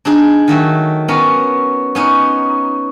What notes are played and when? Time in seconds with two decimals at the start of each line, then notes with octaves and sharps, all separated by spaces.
0.05 D4 D#4 G#4
0.48 D#3 F#3 A3
1.08 B3 C#4 A#4
1.95 B3 C#4 D#4